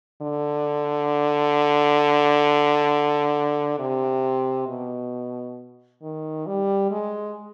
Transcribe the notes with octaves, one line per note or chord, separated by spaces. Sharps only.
D3
C3
B2
D#3
G3
G#3